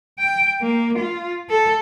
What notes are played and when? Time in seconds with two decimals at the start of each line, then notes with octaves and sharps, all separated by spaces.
0.19 G5
0.62 A#3
0.98 F4
1.50 A4